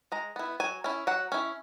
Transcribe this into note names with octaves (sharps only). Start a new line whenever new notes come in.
G#3 A#5
B3 E4
F#3 G#5
C#4 E4
F#3 F#5
C#4 E4